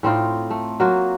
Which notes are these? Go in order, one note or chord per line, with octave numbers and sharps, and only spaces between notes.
A2 C4 D#4 F4
A3
F#3 A#3 F4 F#4